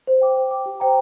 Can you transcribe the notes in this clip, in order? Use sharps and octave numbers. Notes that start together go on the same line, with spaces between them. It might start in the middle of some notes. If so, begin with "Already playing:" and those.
C5
G5 D6
C5
G5 D6
G4
C5 G5 A#5